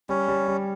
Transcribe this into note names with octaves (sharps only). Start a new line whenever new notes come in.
G3 C#4
G3
G3